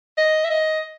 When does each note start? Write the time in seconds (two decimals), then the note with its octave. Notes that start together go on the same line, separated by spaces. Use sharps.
0.17 D#5
0.44 E5
0.50 D#5